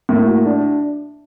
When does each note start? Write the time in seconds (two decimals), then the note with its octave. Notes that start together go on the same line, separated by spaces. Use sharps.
0.09 A2 A#3
0.27 F#4
0.45 D4